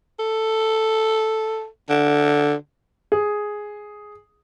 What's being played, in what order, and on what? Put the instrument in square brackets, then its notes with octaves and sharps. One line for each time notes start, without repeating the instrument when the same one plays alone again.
[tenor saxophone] A4
D3
[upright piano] G#4